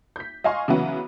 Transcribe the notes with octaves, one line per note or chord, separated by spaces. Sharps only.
G6 B6
D#5 F5 G#5 C6 C#6
C#3 E3 F#3 B3